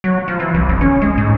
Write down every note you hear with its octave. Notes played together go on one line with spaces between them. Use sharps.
F#3
F3
E3
C2
G1
C#4
G#3
G#2